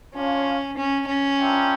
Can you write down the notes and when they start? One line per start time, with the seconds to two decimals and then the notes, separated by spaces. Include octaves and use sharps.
0.14 C#4 D4 F4 C#5 F5
0.77 C#4
1.07 C#4
1.39 D4 F4 A#4 E5 G5